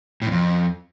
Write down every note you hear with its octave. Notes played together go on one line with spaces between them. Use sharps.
A2
E2
F2